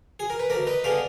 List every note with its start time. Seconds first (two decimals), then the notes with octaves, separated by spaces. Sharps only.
0.20 G#4
0.30 A#4
0.39 B4
0.50 D2 A#4 D5
0.67 B4 D#5
0.84 D3 G#3 B3 D5 F5